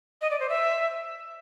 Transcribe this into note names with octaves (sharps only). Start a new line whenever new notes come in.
D#5
D5
C5
E5